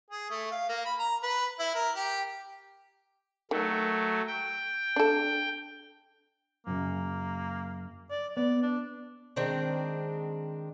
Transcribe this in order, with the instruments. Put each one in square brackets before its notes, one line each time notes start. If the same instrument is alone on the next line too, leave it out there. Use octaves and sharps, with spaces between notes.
[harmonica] G#4
A3
F5
A#3
B5
A#5
B4
E4
A#4
G4
[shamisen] D#3 [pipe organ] F#3 A3
[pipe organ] G5
[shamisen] D4 A4
[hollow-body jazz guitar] F#2 C#3 [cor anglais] A#3
[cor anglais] D5
[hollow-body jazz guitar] B3 [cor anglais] D5
[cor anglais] D4
[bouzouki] D#3 G#3 C4 D4